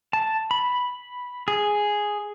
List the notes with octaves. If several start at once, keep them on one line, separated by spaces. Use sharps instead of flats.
A5
B5
G#4